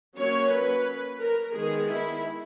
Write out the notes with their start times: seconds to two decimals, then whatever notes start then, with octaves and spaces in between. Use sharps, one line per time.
0.16 F#3 A#3 C#4 C#5
0.50 B4
1.21 A#4
1.55 D#3 G#3 B3 G#4
1.90 E4